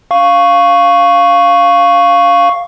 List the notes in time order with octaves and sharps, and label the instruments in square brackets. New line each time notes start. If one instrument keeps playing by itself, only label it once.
[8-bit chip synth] F5 C#6